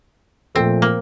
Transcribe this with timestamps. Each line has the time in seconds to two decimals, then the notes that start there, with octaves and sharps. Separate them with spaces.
0.55 A#2 F3 A3 C4
0.82 A#3